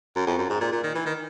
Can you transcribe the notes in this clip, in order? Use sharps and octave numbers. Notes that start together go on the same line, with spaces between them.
F#2
F2
F#2
G#2
A#2
A#2
D#3
E3
D#3